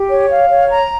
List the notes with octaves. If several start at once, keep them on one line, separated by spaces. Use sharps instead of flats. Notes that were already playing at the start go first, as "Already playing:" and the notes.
Already playing: G4
C#5
F5
C#5
A#5